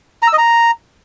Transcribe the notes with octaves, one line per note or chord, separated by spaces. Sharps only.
A#5
E6
D#5
A#5